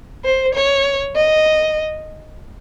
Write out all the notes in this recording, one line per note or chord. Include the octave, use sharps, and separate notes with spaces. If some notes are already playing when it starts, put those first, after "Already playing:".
C5
C#5
D#5